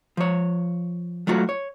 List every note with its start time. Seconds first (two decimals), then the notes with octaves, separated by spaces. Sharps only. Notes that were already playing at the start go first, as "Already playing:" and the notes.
0.17 F3 C#5
1.27 F#3 A3 F4 F#4
1.49 C#5